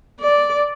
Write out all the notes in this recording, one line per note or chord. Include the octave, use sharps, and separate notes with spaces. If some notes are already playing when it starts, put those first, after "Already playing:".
D5